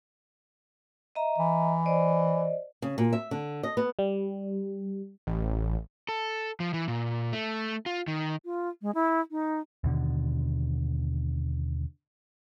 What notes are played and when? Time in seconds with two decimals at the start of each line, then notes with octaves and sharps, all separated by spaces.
1.15 D#5 E5 A#5
1.38 E3
1.86 C5 D5 D#5
2.82 C#3
2.98 A#2
3.13 E5
3.31 D3
3.63 D#5
3.77 B3
3.99 G3
5.27 A1
6.09 A4
6.60 F3
6.74 E3
6.88 A#2
7.33 A3
7.86 F4
8.08 D#3
8.45 F4
8.82 G#3
8.95 E4
9.31 D#4
9.84 D#2 B2 D3